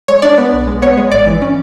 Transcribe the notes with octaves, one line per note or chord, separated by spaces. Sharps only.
G#3 C#5
D4 D5
B3
B1
G#3
B3 C#5
G#3
G#1 D5
E3
C#4